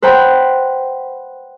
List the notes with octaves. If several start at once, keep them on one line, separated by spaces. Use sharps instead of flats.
B4 C5 F#5 G5 B5